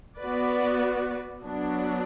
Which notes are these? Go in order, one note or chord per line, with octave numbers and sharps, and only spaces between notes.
B3 F#4 B4 D5
F#3 B3 D4